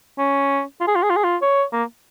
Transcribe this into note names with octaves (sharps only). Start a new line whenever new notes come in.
C#4
F4
G#4
F4
G#4
F4
G#4
F4
C#5
A#3